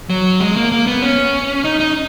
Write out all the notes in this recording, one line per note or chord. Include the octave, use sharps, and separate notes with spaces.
F#3
G#3
A#3
A#3
B3
C#4
D#4
D#4